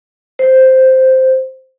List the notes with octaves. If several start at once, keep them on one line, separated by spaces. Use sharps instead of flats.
C5